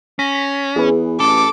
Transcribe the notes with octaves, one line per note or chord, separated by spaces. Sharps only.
C#4 A#6 B6
E2 G#4 B4
A1 A4 D6